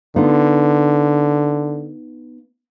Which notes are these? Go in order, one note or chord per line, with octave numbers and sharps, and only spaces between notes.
D3 B3 D#4 F4